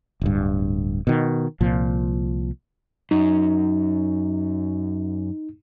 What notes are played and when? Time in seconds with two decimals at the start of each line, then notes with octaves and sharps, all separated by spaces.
0.21 D1 G2
1.07 B2 D#3
1.61 C2 A#2 F3
3.11 F#2 D#4